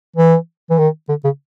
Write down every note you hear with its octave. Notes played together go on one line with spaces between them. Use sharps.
E3
E3
D#3
D3
C#3